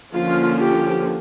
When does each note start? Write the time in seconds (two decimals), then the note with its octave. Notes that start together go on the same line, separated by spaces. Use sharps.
0.13 D3 F3 A#3 C#4 F4
0.60 G4